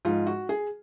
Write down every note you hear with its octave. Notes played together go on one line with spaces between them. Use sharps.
G#2 F3 G#3 F4
F#4
G#4